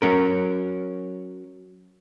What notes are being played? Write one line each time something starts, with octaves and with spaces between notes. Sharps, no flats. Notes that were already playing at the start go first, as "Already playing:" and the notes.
F#3 C#4 A#4